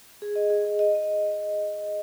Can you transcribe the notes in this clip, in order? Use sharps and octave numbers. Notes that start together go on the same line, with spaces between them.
G#4
D#5
G#4
G#4
D#5
D#5